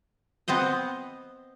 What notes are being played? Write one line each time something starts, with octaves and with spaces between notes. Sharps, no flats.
B3 C4 C5 D#5